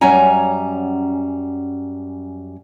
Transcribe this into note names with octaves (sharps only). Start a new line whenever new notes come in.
F#2 G3 C#4 G#5 A#5